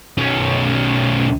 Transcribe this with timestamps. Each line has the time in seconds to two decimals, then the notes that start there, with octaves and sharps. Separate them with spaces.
0.18 B1 C#4